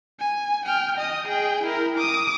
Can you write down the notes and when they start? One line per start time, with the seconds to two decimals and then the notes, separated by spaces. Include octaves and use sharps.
0.20 G#5
0.66 G5 F6
0.98 D#5 D#6
1.28 G#4 G5
1.64 E4 A#4
1.98 D6 D#6